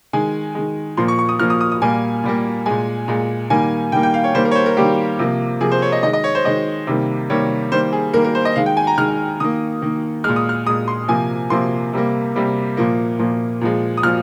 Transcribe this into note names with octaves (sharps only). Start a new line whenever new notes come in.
D#3 G#3 G#5
D#3 G#3
A#2 F3 A#3 C6
C#6
C#6
D#6
A#2 F3 A#3 F6
D#6
D#6
D#6
A#2 G3 A#3 G#5
A#2 G3 A#3
A#2 G#3 G#5
A#2 G#3
D#3 G3 A#3 G#5
D#3 G3 A#3 G5
G5
F5
C#5
D#3 G3 A#3 C5
A#4
C#5
C5
A#4
D#3 G3 A#3 G4
C3 F3 A#3
C3 F3 A#3 G#4
C5
C#5
D#5
D#3 G#3 D#5
D#5
C#5
C5
D#3 G#3 D#5
C3 D#3 G3 A#3
C3 D#3 G3 A#3 C#5
D#3 G3 A#3 C5
G#4
D#3 G3 A#3 A#4
A#4
C5
D#5
D#3 G#3 F5
G5
G#5
A#5
D#3 G#3 F6
D#3 A#3 D#6
D#3 A#3
A#2 G#3 F6
D#6
F6
A#2 G#3 D#6
C6
C3 F3 A#3 G#5
C3 F3 A#3 C6
C3 G3 A#3
C3 G3 A#3
A#2 F3 A#3
A#2 F3 A#3
A#2 F3 G#3
D#6
A#2 F3 F6